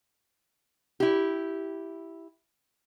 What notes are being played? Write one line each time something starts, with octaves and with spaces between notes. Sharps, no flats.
E4 G4